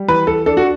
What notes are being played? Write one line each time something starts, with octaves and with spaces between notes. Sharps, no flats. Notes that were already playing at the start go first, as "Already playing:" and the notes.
Already playing: G3
E3 B4
A4
D4 A4
F#4